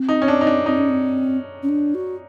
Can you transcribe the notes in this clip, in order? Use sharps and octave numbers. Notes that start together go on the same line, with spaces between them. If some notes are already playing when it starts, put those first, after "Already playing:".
Already playing: C4
D#4
C#4
D4
D#4
D4
C4 D#4
C#4
C4
C#4
D4
F#4